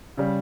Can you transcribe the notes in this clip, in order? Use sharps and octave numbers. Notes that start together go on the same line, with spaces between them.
C#3 G3